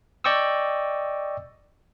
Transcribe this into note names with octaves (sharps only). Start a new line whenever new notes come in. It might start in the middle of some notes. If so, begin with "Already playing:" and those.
D5 D#5 G5 C#6 D#6 E6